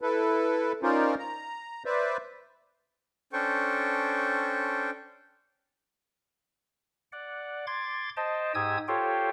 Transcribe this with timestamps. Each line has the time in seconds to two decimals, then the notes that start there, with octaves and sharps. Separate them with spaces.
0.02 E4 A4 B4
0.83 C#4 D#4 F4 A#4 C5 D5
1.18 A#5
1.85 B4 C5 D5 E5
3.33 C#4 D4 A4 C5 G5 C#6
7.12 D5 F#5
7.67 C6 D6 G#6 A6
8.17 C5 D#5 G5 A5
8.55 G#2 G4 G#5 D#6 E6 G#6
8.88 F4 G4 A4 C5 C#5 G5